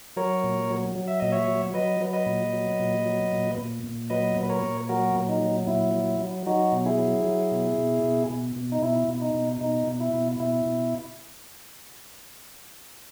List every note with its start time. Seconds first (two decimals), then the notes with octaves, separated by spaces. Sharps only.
0.16 F#3 A#4 C#5
0.44 A#2
0.70 F#3
0.96 F#3
1.08 E5
1.20 A#2 D#5
1.32 C#5 E5
1.48 F#3
1.74 F#3 B4 D#5
2.00 F#3
2.13 B4 D#5
2.26 A#2
2.53 F#3
2.79 A#2
3.06 F#3
3.32 A#2
3.58 A#2
3.84 A#2
4.10 F#3 B4 D#5
4.36 A#2
4.43 B4
4.49 A#4 C#5
4.63 A#2
4.89 F#3 F#4 A#4
5.15 A#2
5.29 D#4
5.41 F#3
5.67 A#2 E4
5.94 F#3
6.21 F#3
6.46 F#3 D#4 F#4
6.72 B2
6.86 E4 G#4
6.98 F#3
7.24 F#3
7.52 B2
7.78 B2
8.04 B2
8.30 B2
8.56 B2
8.72 D#4
8.82 B2 E4
9.08 B2
9.22 D#4
9.35 B2
9.61 B2 D#4
9.87 B2
10.01 E4
10.13 B2
10.40 B2 E4
10.66 B2